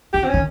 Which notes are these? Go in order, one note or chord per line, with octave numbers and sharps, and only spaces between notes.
D#3 G4
C4
D#3 C#4